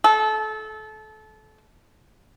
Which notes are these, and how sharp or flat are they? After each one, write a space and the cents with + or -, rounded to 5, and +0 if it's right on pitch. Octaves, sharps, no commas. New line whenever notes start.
A4 -25